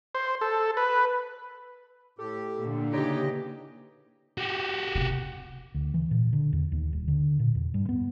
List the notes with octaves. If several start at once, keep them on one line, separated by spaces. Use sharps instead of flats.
C5
A4
B4
A2 G4 A4
A#2 D3
C#3 E3 D#4 G4 C#5 D#5
F#4 G4
B1 C3
D2
E3
A#2
D3
E2
D#2
D#1
D3
A#2
E2
G2
B3